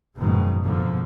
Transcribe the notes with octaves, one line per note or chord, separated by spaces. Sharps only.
F#1 G#2 B2 D#3 F3 G#3
G#1 F2 B2 D3 F3 A#3